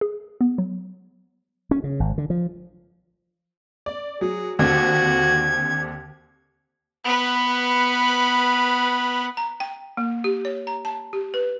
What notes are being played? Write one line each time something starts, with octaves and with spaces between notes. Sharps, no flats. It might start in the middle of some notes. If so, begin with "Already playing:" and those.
G#4
B3
F#3
C#4
C#3
G#1
D3
F3
D5
F#3 G#4
D#2 D3 C4 F#4 G#6
B3 B4
A#5
G5
A#3
G4
C#5
A#5
A5
G4
B4